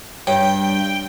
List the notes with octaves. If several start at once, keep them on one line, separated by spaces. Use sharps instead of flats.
G2 C#5 G5